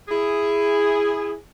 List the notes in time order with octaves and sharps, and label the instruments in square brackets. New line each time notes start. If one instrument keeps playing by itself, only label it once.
[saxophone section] E4 G#4